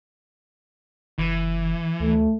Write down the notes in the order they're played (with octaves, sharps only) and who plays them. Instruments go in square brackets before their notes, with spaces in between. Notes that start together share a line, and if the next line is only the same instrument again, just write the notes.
[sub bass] F#1 [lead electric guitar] E3
[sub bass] D2 [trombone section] A3